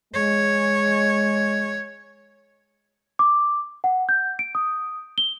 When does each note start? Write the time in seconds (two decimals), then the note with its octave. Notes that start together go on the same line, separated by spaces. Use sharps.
0.14 G#3 C#5
3.19 D6
3.84 F#5
4.09 G6
4.39 D7
4.55 D#6
5.18 G7